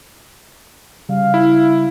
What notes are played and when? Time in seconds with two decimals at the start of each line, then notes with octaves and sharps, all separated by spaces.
1.09 C#3 G3 F5
1.34 E4